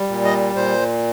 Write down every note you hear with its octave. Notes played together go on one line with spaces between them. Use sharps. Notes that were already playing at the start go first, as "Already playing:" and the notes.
Already playing: G3
A#2
D#5
A#2 C5